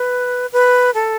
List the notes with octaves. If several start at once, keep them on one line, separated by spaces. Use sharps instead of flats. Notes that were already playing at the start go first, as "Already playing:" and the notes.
Already playing: B4
B4
A4